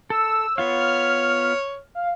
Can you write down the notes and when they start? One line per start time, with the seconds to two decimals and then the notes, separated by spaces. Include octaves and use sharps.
0.10 A4 E6
0.58 B3 F4 C#5 F5
0.77 F6
1.95 F5